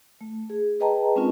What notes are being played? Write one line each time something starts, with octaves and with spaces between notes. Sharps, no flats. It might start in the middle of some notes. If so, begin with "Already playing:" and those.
A3
G#4
G#4 B4 D#5 G5 A5 A#5
G#3 C4 C#4 D#4 F4 A#4